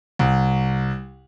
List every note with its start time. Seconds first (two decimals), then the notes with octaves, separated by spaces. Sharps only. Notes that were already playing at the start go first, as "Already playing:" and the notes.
0.19 C2